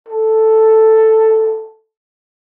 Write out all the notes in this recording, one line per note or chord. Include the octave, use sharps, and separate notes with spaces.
A4